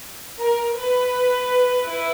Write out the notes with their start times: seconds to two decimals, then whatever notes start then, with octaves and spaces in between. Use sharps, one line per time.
0.39 A#4
0.75 B4
1.84 E4